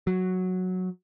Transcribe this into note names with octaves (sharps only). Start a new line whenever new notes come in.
F#3